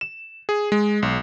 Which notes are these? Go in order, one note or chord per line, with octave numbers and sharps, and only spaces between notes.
E7
G#4
G#3
B1